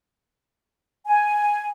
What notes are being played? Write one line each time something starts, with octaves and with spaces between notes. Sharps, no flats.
G#5